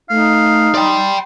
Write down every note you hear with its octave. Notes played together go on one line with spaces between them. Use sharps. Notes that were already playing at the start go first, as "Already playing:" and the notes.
A3 D#4 F5
D5 G5 C6